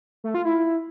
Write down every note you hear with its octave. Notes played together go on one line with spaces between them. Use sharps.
A3
F4
E4